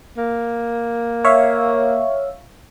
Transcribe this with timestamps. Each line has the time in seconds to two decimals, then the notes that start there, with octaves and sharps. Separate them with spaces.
0.17 A#3
1.25 C#5 E5 F5